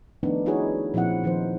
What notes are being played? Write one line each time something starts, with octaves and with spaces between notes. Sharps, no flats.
D#3 F3 A3 B3 D4 D#4
D#4 E4 F#4 G#4 B4 C#5
A#2 F3 C4 E4 F#5
D#3 F3 D#4 C5